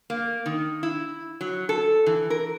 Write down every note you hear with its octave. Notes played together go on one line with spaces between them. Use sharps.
A#3
D#3
E4
F#3
A4
E3
A#4